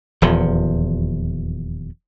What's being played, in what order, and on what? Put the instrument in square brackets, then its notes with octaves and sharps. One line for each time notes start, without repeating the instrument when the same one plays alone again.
[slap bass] D#1 E2 F3